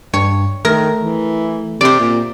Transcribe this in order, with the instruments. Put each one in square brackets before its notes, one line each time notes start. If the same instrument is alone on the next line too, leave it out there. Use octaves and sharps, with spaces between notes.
[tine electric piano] G2 [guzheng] C#5
[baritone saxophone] D#3 [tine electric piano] A3 [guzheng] A#4
[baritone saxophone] E3
[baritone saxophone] C3 [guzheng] C5 D5
[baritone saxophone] A#2